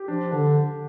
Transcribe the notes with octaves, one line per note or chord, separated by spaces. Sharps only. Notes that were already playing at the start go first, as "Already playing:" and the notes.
Already playing: G4
F3 D4
D3 D4